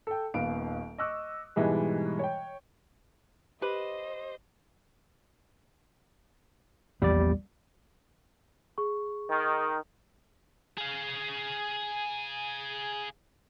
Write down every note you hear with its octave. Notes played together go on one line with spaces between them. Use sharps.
A4 G5
D#1 D#2 B3 F5 D7
D#5 C#6 D6 E6 F#6
G#2 B2 E3 G3 G#3
C#5 G5
G4 B4 C5 D#5
A#1 E2 G3 B3 D5
G#4 C#6
D#3
G#4 F5